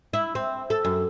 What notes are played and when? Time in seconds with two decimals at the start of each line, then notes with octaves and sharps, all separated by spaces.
0.13 E4
0.35 C4
0.70 A4
0.85 F#2